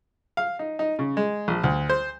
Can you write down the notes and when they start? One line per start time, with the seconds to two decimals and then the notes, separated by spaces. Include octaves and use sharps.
0.37 F5
0.59 D#4
0.79 D#4
0.99 C#3
1.17 G#3
1.48 A#1
1.63 D2
1.90 C5